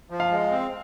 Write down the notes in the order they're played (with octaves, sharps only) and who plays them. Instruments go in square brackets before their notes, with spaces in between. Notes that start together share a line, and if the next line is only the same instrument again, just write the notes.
[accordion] F3
[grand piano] F5
[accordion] G#3
C4